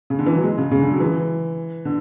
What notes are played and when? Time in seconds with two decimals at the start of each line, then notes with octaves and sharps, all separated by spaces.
0.10 C#3
0.19 D3
0.26 E3
0.35 F#3
0.44 G#3
0.58 C#3
0.71 C#3
0.82 D3
0.90 F#3
1.00 E3
1.85 D3